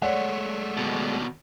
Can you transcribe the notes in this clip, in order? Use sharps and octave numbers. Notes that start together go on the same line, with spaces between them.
G#3 A3 C#5 D5 F#5
D#2 B2